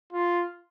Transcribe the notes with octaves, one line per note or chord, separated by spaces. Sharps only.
F4